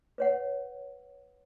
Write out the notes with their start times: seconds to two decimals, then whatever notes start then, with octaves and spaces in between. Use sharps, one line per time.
0.18 B4 C#5 F#5